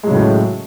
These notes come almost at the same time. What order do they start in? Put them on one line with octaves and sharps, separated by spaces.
G#3 F#3 C#3 A2